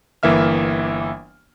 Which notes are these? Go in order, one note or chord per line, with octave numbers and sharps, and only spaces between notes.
G1 E3 A#3 E5 F6